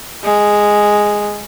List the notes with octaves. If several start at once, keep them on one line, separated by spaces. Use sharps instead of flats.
G#3